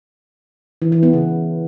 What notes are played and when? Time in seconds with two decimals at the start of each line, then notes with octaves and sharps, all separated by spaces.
0.82 E3
0.92 E3
1.03 B3
1.13 C#3